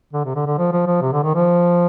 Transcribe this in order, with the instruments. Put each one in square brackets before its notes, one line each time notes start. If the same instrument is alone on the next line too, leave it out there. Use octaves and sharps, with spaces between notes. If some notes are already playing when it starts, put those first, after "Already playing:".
[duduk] D3
C3
D3
D3
F3
F3
F3
C3
D3
D#3
F3